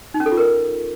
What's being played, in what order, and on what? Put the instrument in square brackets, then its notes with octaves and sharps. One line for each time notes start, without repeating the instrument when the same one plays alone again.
[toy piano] D#4
C#4
A4
F4
A#4